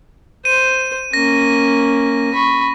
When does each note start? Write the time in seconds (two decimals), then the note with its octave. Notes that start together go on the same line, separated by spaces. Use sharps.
0.45 C5 D#7
1.13 A#3 C#4 A#6
2.33 B5 C#6